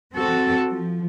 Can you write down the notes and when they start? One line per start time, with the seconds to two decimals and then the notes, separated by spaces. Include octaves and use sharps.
0.14 C4 F#4 A4
0.71 F3